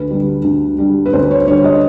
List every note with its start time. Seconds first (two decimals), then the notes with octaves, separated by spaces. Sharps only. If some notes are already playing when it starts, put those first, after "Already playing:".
Already playing: D2 B4
0.10 D3 G3
0.44 D2
0.78 D3 G3
1.06 B4
1.13 D2 C5
1.31 C#5
1.47 D3 G3 C#5
1.64 D#5